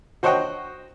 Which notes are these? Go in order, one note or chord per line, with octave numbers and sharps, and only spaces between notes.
F#4 C5 C#5 D#5 F#5 G5